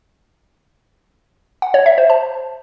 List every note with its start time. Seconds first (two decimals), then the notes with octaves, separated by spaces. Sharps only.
1.62 F#5
1.74 C#5
1.86 E5
1.98 C5
2.10 A5